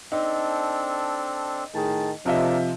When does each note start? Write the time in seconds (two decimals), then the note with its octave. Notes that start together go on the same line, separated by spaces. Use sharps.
0.12 C4 D4 D#4 A4
1.74 A2 D#3 G#4 A5
2.26 C3 F3 D4 A4 A#4 D#5 E5